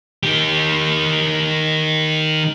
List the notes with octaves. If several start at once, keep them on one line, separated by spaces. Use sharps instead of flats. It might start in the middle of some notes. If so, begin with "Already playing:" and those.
D#3 G4